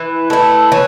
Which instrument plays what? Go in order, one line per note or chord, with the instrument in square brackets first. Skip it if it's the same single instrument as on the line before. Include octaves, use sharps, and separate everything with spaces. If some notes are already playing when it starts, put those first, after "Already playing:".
Already playing: [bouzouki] E3 [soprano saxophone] B4
[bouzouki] A3 E4 [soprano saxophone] B4
[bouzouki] E3 [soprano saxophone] C#5